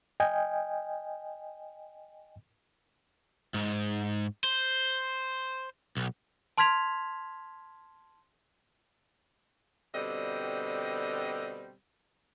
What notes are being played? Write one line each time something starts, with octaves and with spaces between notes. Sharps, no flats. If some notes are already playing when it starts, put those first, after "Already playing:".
D#5 G5 G#5
G#2
C5
B1
A5 C6 F6 G#6 B6 F7
B2 D3 G3 C4 D#5